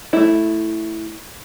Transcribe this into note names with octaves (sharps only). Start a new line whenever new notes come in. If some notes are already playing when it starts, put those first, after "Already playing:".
A3 E4